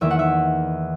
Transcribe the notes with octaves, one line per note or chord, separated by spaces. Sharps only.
E2 D#3 A#3 E4 E5
F#5
E5